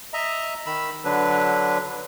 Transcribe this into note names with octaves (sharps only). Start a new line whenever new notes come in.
D#5 E5 A#5
D#3 B5 E6
D3 F#3 D4 B4